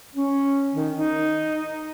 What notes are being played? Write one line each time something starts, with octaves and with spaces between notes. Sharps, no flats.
C#4
D#3
D#4